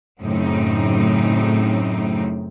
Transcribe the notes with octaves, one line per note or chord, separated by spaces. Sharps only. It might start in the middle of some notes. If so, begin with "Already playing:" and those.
F#2 A2 C#3 C4 D#4